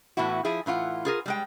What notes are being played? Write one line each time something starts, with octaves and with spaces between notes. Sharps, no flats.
A2 E3 B3 E4 F#4
F3 E4 G#4
A2 E3 F4 F#5
F4 G#4 A#4
G3 G#3 G5